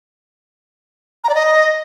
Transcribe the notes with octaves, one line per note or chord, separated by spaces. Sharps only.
A#5
D5
D#5